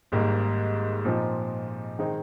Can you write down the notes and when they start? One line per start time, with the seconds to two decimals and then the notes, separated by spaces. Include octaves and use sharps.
0.12 G#1 G#2 G3 A#3
1.05 A#2 F3 C4 D#4
1.99 D#3 G#3 C4 D#4